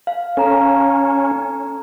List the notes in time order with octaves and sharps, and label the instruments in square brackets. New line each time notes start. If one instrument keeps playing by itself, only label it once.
[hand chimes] F5
[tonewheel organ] C#4 [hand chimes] A4 A#5